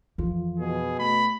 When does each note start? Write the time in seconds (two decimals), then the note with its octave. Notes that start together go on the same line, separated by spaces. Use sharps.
0.18 F2 E3 F3 F4
0.60 B2 G#4
1.00 A3 B5